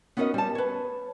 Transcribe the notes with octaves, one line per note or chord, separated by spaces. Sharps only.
B3 C#4 D#4 F#4 A#4 D#5
G3 A5
B4 C#5